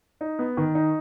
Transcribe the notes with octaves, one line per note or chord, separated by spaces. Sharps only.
D#4
B3
D#3
D#4